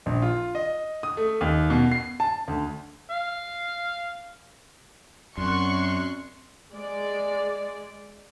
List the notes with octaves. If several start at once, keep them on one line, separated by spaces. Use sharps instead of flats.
A#1
F4
D#5
D#6
A3
D#2
B2
C7
A5
D2
F5
F#2 C4 C#4 D5 C6 C#6 F#6
G#3 D5